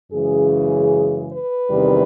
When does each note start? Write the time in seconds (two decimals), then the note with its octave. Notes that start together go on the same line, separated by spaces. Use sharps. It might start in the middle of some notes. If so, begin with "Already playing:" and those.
0.11 F#2 C#3 E3 G#3 G#4
1.31 B4
1.71 E2 C3 D#3 G3